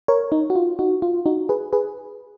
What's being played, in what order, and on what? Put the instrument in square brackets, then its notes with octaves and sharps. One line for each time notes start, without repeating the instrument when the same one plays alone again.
[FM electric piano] A#4 C#5
D#4
F#4
F4
D#4 F#4
F4
D#4 F#4
G#4 B4
G#4 B4